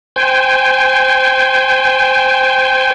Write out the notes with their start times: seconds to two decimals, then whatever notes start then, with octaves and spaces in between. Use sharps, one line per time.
0.16 C5 G5 G#5